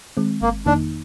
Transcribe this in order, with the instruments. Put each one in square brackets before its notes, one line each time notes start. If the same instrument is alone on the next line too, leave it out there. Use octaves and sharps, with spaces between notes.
[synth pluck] D#3 G#3 C4
[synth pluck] G1 [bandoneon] A#3
[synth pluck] F2 D#3 A#3 D#4 [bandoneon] D4